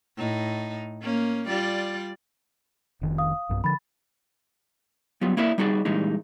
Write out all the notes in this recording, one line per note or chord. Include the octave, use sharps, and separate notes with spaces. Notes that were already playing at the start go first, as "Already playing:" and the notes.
A2 D#4
A#3 C#4
G3 F4 D5
F1 D#3
F5 D#6
B1 G2
D3 F3 B5 A6
F#3 G3 B3 F4
A#3 E4 F#4 A#4 D5 E5
G3 D#4 F#4 G#4 D5
A#2 E3 G3 G#3 D#4